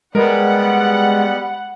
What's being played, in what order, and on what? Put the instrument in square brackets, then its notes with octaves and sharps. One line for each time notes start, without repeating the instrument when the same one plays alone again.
[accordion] G3 B3 [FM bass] G#3 [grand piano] A#4 [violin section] F#5